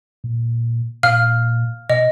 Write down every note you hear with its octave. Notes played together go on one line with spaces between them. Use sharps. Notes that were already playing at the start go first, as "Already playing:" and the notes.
A#2
A#2 F5 F6
B2 D#5